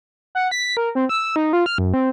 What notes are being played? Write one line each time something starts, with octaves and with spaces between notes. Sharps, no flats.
F#5
B6
A#4
C4
E6
D#4
F4
F6
F#2
C4